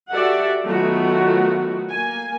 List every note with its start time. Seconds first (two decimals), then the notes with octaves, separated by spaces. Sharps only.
0.11 F#4 G4 A4 D5 E5 F#5
0.65 D#3 F#3 A3 B3 F4 F#4
1.89 A#3 G#5